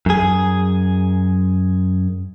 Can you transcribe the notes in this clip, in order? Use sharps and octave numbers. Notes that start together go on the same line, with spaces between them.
F#2 G#4